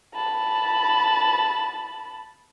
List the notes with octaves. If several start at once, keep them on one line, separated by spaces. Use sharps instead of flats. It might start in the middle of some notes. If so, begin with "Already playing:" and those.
A5 B5